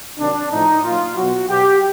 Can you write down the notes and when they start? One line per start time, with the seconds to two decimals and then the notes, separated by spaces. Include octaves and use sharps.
0.18 C3 D#3 F#3 D4
0.51 A2 F3 D#4
0.83 A#2 F#3 F4
1.16 B2 F#3 F#4
1.49 B2 F#3 G4